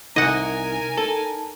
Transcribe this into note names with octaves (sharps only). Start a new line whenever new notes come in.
C2 D#4 A#4 D#5 F#5 G#5
A4